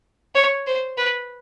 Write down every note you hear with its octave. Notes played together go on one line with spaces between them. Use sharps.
C#5
C5
B4